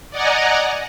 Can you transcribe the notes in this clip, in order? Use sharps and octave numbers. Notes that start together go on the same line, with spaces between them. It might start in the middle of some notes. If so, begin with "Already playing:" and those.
D5 D#5 F#5 G#5 A#5